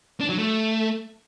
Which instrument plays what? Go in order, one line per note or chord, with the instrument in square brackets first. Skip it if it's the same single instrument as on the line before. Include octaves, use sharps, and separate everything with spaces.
[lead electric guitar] D4
F#3
A3